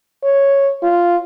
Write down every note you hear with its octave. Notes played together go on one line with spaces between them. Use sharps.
C#5
F4